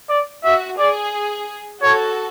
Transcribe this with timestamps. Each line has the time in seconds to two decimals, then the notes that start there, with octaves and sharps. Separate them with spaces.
0.10 D5
0.44 F#4 E5
0.78 G#4 D5
1.82 F#4 A4 C#5